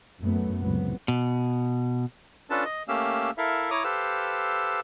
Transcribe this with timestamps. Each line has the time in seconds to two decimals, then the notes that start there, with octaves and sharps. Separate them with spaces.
0.20 F#2 F#3 A3 B3
0.62 C#2 A2 C3 F#3 B3
1.08 B2
2.50 C#4 D4 F4 A4 B4 A5
2.65 D#5
2.88 A3 A#3 C#4 G4 F5 E6
3.38 E4 A4 A#4 E5 F5
3.71 E4 C#5 A#5 D6 D#6
3.84 G4 A4 B4 C5 F5 E6